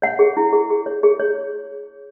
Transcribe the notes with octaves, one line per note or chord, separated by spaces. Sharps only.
C#5 F#5
G#4
E4
G#4
G#4
C#5
G#4
C#5